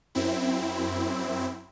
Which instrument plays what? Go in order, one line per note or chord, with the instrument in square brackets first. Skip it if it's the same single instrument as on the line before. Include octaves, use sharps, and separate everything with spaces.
[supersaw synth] F#2 C4 E4